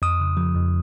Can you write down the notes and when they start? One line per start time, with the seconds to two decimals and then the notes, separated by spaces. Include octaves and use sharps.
0.02 F2 D#6
0.20 C#3
0.37 F3
0.55 F2